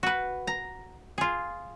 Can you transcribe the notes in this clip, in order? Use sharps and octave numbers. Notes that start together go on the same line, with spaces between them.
F#4 B4
A#5
F4 G#4